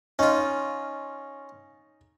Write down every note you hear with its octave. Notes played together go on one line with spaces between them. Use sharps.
C#4 D#4 F4